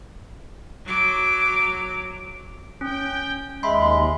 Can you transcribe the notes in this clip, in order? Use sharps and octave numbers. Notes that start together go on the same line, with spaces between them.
F#3 D6
C#4 G5
D#2 G#3 E5 B5 C6